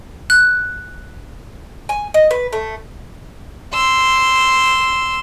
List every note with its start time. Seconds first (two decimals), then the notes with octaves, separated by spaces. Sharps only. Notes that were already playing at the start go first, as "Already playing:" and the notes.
0.30 F#6
1.89 G#5
2.14 D#5
2.31 B4
2.53 A3
3.73 C6 E6